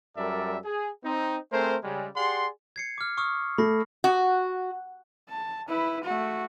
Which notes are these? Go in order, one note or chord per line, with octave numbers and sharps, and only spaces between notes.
F#2 G3 A4 A#4 D5 E5
G#4
C4 D#4
A3 C4 G#4 A#4 C5
C#3 G3 G#3
G4 G#4 D5 F#5 C6
G#6 C7 C#7
D6 F6
C#6 D#6 F6
A3 B5 A#6 C7
F#4
A5
E4 B4
A3 F#4